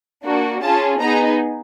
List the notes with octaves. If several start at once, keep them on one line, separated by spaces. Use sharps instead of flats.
A#3 D4 F#4
C#4 F4 G#4 A5
B3 D#4 G#4 A#5